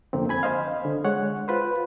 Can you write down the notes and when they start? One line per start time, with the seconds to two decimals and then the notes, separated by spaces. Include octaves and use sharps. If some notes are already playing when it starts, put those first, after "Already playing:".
0.13 F2 D3 A#3 C4
0.29 G#5 B5 G#6
0.43 C5 D#5 F5
0.85 D3
1.04 G#3 C#5 F#5
1.48 F4 B4 C5